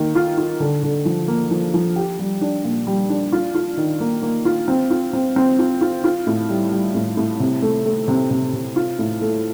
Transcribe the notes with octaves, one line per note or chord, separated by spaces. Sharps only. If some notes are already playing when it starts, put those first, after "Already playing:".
Already playing: D#3 A#3
F4
F4
D3
D3
F3
A#3
F3
F3
G4
G3
D4
A#2
G3
D4
F4
F4
D#3
A#3
A#3
F4
C4
F4
C4
C4
F4
F4
F4
A2
G3
G3
A2
A2
C3
A3
A3
C3
C3
C3
F4
A2
A3